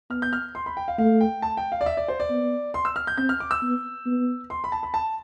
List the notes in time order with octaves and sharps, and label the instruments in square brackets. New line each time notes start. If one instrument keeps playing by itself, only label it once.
[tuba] B3 [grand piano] F6
[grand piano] G6
F6
C6
B5
G5
F5
[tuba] A3 [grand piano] F5
[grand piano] G5
A5
G5
F5
D5
E5
D5
C5
D5
[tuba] B3
[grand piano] C6
E6
F6
G6
[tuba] C4 [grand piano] G6
[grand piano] F6
D6
E6
[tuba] B3
B3
[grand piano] C6
B5
A5
B5
A5